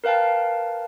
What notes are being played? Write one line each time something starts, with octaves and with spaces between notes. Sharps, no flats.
A#4 B4 F5 G5 A5